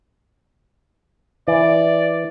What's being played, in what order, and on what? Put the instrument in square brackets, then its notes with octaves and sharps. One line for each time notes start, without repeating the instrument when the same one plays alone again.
[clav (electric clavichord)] E3 [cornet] D5